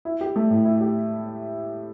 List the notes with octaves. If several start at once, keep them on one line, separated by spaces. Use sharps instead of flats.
E4
G4
A3
A2
E4
G4